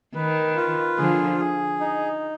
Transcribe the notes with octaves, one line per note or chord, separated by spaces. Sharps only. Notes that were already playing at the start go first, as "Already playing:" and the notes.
D#3 B4
F4
D3 F3 G#4
G#4
D#4